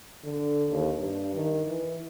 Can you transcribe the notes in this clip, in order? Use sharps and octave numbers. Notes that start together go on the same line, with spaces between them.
D3
D#2
G2
D#3
E3